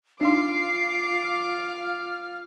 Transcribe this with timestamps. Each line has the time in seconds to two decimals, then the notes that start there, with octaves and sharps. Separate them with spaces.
0.21 D4 D#4 F4 F5 C6 D6 C7
1.24 F6